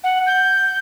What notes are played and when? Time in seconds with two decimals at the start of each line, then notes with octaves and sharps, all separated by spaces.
0.03 F#5
0.26 G6